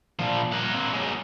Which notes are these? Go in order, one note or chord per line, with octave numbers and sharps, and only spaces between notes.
A#2 F3
A#4 F#5
A#3 C4
F#3 G#3